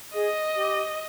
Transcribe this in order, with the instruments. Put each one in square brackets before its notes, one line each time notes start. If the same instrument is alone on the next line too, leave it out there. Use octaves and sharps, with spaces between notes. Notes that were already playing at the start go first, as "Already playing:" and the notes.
[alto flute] G#4 [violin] D#5
[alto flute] G4